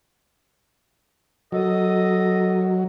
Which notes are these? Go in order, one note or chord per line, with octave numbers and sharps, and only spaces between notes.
F#3 A4 A#4 D#5